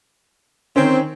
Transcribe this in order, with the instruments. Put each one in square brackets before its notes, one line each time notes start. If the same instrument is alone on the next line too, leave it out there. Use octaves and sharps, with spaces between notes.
[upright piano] D#3 C#4 [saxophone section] C4